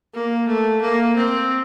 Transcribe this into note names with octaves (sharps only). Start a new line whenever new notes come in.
A#3
A3
A#3
C4